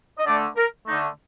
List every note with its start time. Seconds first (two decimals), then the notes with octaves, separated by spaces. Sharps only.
0.19 D#5
0.26 D3 A3 D5
0.56 A#4
0.87 D3 A3 D#4